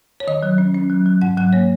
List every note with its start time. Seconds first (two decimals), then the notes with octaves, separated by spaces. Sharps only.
0.20 C#5
0.27 D#3 D#5
0.43 F#3
0.58 C#4
0.74 C#4
0.90 F#3
1.06 F#3
1.22 G#2 F#5
1.37 F#3 F#5
1.53 A#3 C#5